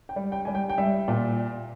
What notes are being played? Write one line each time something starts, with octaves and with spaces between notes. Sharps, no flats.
G5
G3
G5
G3 G#5
G5
G5
G3 E5
A#2